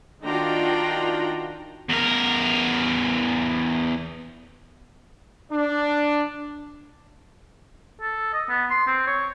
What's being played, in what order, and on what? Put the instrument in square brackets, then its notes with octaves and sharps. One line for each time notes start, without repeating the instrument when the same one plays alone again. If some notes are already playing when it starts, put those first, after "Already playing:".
[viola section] D#3 D4 F4 F#4 G5 A#5
[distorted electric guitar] E2 A#4
[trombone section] D4
[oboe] A4
D#5
B3
C6
C4
C#5